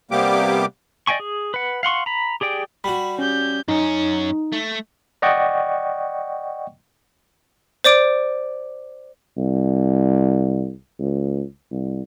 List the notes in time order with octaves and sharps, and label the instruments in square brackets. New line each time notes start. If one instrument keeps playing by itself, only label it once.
[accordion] C3 G3 A#3 B3 G4 D6
[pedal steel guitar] D5 D#5 G5 G#5 C#6
G#4
B4 F#5
F5 F#5 C6 C#6
A#5 B5
G4 G#4 D5 G5
[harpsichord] G3 F#4 [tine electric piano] B5
[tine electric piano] C#4 [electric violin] G4 G6
[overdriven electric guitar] F#2 C#4 [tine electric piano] D#4
[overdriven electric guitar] A3
[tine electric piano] D5 D#5 F#5 G5 C#6
[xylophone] C5 D5 D6 D7
[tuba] C2
C#2
C2